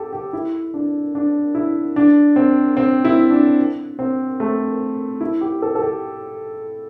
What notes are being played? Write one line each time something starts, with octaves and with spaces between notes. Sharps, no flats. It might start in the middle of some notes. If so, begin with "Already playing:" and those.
Already playing: G4 A4
G4
E4
D4
D4
E4
D4
C4
C4
E4
D4
C4
A3
E4
G4
A4
A4
G4